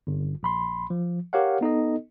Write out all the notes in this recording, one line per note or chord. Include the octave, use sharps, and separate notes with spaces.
G1
A#1 B5 C6
F3
G4 A#4 C#5 F5 F#5
B3 D#4 A4 D#5